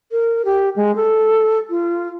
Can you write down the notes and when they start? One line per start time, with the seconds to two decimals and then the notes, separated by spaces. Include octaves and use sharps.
0.12 A#4
0.45 G4
0.76 G#3
0.96 A4
1.70 F4